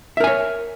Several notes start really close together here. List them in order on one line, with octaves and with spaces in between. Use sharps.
E5 A#4 G#5 C#5